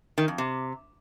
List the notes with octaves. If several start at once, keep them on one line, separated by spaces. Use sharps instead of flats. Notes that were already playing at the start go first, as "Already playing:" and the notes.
D#3
F2
C3